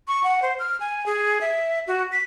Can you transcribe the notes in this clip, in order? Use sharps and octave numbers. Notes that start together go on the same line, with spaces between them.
C#6
F#5
C5
F6
G#5
G#4
E5
F#4
B6